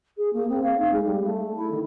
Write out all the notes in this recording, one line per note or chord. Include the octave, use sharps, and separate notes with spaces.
G#4
A#3
C4
F5
D#4
G#3
G3
A3
E4
D#3